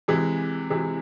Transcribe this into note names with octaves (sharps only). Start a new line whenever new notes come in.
C3 E3 G#3
C3 E3 G#3